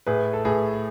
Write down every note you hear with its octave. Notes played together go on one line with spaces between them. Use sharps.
A2 G#4 B4
A4
A2 G#4 B4